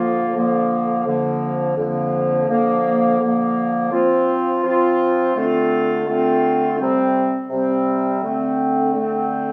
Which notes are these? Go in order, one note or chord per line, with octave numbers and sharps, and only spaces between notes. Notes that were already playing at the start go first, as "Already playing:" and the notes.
Already playing: D3 F3 A#3 F4
D3 F3 A#3 F4
F2 D3 F3 A#3
F2 D3 F3 A#3
D3 F3 A#3
D3 F3 A#3
F3 C4 F4
F3 C4 F4
D3 A3 C4 F4
D3 A3 C4 F4
C3 G3 C4
C3 G3 C4
D3 A3 C4
D3 A3 C4